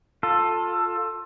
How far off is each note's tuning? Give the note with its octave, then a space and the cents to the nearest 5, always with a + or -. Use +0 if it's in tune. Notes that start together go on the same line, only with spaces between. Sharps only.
F4 +20 A4 +10